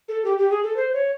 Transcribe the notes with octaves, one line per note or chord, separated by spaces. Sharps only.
A4
G4
G4
G#4
A4
C5
C#5